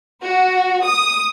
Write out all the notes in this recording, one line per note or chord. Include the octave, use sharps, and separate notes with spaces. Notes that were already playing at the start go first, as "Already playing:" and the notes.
F#4
D#6